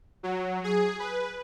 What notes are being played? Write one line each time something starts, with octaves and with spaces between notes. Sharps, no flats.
F#3
G#4
B4